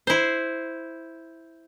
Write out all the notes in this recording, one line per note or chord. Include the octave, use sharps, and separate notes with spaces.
E4 C5